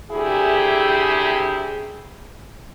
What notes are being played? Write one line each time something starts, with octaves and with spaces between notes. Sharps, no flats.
D2 C3 E4 G4 G#4